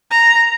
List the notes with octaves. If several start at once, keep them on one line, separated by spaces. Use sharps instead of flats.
A#5